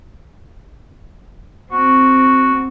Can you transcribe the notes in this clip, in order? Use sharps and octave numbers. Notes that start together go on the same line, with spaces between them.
C4 F#4